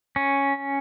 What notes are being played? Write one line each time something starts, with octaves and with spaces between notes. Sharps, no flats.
C#4